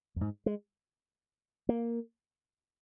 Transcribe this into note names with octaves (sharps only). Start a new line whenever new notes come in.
F2
G#2
G#3
A#3